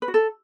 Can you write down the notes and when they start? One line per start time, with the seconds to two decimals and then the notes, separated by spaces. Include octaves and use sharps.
0.02 B4
0.08 F#4
0.14 A4